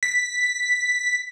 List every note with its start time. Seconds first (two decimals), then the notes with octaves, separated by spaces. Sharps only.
0.03 B6